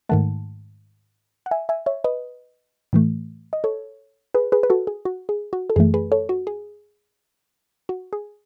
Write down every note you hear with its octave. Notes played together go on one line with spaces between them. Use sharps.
G#2 D#3 A3 F#5 A5
F#5
E5 G#5
E5 G#5
C#5 E5
B4 D#5
A2 E3 A3
D#5
A4 C#5
G#4 B4
G#4 B4
B4
F#4 A4
G#4
F#4
G#4
F#4
A4
F#2 E3 A3 G#4
G#4 B4
A4 C#5
F#4
G#4
F#4
G#4